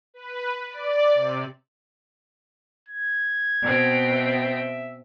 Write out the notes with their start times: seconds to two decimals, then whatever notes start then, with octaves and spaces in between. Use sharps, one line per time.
0.14 B4
0.70 D5
1.14 C3
2.89 G#6
3.63 B2 C4 G5
4.11 E5